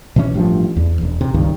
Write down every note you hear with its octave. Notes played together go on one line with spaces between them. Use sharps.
B2 E3 C#4
A1 G2 F3
E2
E1
C3
C#2 G2 D#3